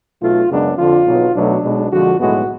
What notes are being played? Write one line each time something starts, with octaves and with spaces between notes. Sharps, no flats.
B1 B2 A3 F4
F#2 C#3 G#3 B3 D4
F2 D3 F3 F4
B1 B2 F#3 B3
B1 B2 F#3 A3 D4
B1 B2 G#3
F2 D3 F3 G#3 F#4
B1 A2 G#3 B3 F#4